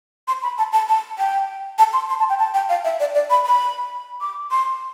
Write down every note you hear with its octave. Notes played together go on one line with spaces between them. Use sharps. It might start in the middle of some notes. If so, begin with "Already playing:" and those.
C6
B5
A5
A5
A5
G5
A5
C6
C6
A5
G5
A5
G5
F5
E5
D5
D5
B5
B5
D6
C6